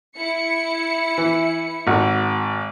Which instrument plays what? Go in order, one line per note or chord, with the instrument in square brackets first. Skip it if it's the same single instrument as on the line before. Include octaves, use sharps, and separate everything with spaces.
[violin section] E4 C#7
[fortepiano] E3
G#1 F#4